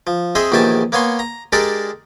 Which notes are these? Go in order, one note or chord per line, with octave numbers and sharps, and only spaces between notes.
F3
C4 G#4 C5 D#5 E5
A#1 E2 D#3 G4 G#5 A5
A#3 B3 C#5 G#5 C6
A#5
G#3 D4 G4 A4 A#4 D5